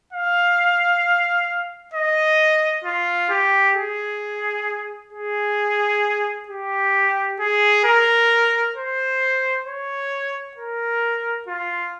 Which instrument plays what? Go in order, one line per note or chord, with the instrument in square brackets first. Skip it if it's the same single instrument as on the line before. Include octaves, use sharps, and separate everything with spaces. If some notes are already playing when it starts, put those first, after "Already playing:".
[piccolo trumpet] F5
D#5
F4
G4
G#4
G#4
G4
G#4
A#4
C5
C#5
A#4
F4